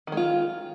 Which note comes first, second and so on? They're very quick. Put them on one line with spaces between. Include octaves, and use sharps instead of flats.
D#3 G#3 F4